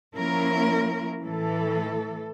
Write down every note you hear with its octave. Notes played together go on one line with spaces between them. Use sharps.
F3 A#3 C#4 E4 A#4
A2 E3 A4